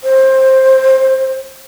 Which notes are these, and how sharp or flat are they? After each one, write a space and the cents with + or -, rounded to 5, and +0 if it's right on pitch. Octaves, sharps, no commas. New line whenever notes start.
C5 +15